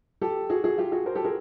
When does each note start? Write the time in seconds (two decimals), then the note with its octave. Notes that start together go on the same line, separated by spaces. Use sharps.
0.21 G4 A4
0.50 F#4 G#4
0.64 F#4 G#4
0.78 F4 G4
0.92 F#4 G#4
1.06 A#4 C5
1.15 G4 A4
1.25 G#4 A#4